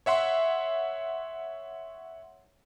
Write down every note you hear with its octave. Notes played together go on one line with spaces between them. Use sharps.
C#5 E5 F#5 C6